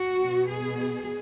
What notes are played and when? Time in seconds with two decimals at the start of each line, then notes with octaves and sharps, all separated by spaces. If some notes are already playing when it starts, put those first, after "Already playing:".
Already playing: F#4
0.21 B2 B3
0.48 G#4